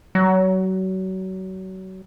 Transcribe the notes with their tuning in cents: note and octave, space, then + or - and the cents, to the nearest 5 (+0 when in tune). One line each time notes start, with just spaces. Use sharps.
F#3 +30